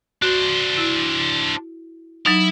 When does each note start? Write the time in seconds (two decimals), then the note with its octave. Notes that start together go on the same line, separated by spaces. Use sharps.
0.22 D4 F#4 C5
0.77 E4
2.26 F#3 D#4 E4